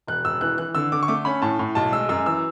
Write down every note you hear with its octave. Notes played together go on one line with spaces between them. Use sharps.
E1 F#6
E1 E6
E3 F#6
E3 F#6
D3 E6
D3 D6
C#6
A3 D6
C#4 B5
A2 A5
A2
B1 A5
G#3 E6
F#2 E6
E3 E6